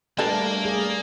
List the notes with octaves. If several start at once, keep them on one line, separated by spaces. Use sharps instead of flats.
G3 A3 A#3 D4 A4 B4
G#4 D5